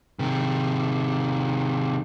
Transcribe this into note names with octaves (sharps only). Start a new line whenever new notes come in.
C3 D#3